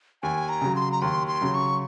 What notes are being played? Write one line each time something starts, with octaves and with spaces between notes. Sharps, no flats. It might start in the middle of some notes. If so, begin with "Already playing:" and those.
D#2 G#5
A#5
C#3 F#3
C6
A#5
D#2 C6
C6
C#3 F#3
C#6